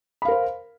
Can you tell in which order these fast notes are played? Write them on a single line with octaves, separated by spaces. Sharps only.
B5 F5 A#4 C5